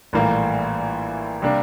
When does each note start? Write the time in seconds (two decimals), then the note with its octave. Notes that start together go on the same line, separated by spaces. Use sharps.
0.13 A#1 A2 E3 G3 A#3
1.42 C3 G3 A#3 D4